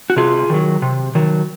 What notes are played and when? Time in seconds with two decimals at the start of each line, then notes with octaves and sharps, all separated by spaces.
0.10 F#4
0.17 C3 F4 G#4
0.50 D#3 F#3
0.82 C3
1.15 D#3 F#3